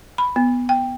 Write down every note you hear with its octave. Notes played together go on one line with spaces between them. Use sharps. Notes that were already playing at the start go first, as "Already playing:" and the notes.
B5
B3
G5